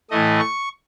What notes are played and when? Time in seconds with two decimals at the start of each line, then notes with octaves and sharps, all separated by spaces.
0.10 A2 E3 A3 D#5
0.39 C#6